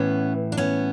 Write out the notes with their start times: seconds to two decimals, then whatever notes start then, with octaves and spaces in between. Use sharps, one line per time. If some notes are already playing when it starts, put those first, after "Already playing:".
Already playing: A2 E3 B3 C#4
0.52 D4
0.57 B3 C#4